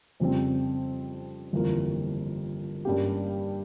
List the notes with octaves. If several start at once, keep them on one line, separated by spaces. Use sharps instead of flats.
F2 C#3 G3 C4
G1 F2 E3 A#3 F4
G2 G3 A#3 C#4 G4